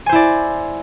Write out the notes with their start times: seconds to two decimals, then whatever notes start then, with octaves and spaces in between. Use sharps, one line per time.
0.06 G#5
0.09 C5
0.12 E4
0.15 D5